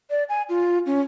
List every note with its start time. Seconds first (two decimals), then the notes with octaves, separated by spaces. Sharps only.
0.10 D5
0.29 G#5
0.49 F4
0.86 C#4